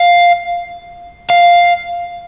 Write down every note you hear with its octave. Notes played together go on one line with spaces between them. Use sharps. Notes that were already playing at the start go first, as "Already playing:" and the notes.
Already playing: F5
F5